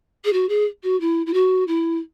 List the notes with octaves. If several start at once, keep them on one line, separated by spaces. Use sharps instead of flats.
G#4
F#4
G#4
F#4
E4
E4
F#4
E4